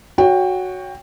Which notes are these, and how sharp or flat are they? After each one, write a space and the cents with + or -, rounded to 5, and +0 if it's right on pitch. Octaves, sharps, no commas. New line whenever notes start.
F#4 +0 C#5 +15 G5 +20